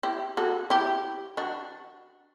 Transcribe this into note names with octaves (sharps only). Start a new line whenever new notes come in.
E4 G4
F#4 A4
E4 G4
D4 F#4